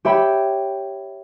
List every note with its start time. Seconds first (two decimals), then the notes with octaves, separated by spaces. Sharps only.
0.05 G4 C#5 E5 G5 B5